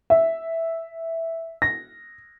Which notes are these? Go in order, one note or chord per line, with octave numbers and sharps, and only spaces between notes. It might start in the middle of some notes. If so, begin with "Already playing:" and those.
E5
A#6